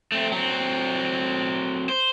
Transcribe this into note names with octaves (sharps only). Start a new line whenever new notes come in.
A3 C4
F#3 C4
C5